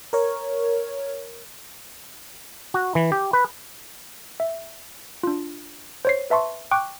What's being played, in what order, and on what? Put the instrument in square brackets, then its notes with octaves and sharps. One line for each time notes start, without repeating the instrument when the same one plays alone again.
[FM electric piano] A#4 C#5
[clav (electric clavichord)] F#4
E3
G4
B4
[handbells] E5
D4 F4
C5 C#5 C7
B4 E5 A5 C6 C#6
G5 C#6 D6 F#6